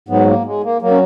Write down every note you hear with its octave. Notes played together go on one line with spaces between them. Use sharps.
G#2 F#3 B3
A#3
G#3
A#3
F#3 A#3
C#4